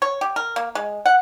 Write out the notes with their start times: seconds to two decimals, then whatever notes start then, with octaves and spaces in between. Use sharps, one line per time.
0.02 C#5
0.21 G4
0.36 A#4
0.56 A#3
0.75 G#3
1.06 F#5